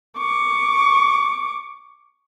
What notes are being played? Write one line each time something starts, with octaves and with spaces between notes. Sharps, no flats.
C#6 D6